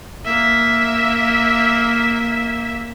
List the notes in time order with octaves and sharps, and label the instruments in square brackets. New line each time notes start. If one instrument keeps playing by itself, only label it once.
[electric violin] A#3 E5